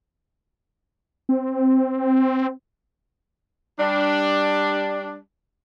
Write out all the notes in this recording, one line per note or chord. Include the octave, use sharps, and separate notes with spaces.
C4
G3 D4